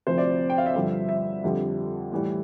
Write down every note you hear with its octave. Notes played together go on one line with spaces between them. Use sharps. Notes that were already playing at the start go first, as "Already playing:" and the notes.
D2 C3 F3 C5
D5
G5
F5
E5
G2 D3 F3
E5
F2 D3 G3
A2 E3 G3